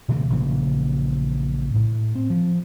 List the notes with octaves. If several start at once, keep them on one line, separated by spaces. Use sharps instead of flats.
B2 D3 E3 A3
A#1 C#3 E3 A#3
A2
C4
F3